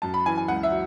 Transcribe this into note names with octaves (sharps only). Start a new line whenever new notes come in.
F#2 A5
B5
E3 G#5
G#5
C#2 F#5
E5
F#3